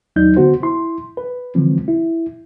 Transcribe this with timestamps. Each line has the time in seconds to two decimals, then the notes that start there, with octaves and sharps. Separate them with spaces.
0.16 D#2 F#3 D4 D#4 G6
0.37 D3 B3 F#4 C5
0.63 E4 C6
1.17 B4
1.55 D3 E3 F3 G#3 C4
1.88 E4